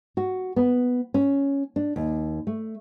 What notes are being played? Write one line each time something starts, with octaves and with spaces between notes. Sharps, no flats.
F#4
B3
C#4
D4
D#2
A3